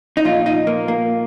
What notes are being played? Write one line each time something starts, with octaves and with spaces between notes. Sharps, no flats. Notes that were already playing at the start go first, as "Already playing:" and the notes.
D#4
A#2 F3 F4
D#4
A#3
A#3